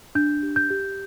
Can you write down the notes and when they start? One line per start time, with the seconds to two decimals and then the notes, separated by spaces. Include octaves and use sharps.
0.15 D4 G6
0.43 G4
0.56 G6
0.70 G4